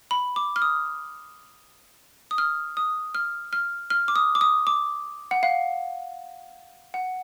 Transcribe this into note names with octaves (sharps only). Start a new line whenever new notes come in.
B5
D6
F6
D#6
D#6
F6
D#6
F6
F6
F6
D6
D#6
D6
D#6
D6
F#5
F5
F#5